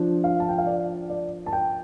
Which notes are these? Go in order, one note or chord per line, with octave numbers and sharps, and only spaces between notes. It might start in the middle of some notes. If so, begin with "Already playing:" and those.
Already playing: F3 D4
F5
A5
G5
F5
D5
D5
A5
G5